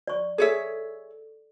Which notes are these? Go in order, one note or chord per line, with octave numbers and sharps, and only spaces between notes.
D5 C#6
G#4 A4 C#5 E5